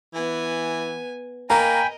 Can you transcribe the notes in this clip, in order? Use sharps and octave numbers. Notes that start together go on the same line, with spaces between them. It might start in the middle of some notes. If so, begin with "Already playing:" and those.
E3 B3 G#5
A#3 A#4 D#5 G5 G#5 A#5 B5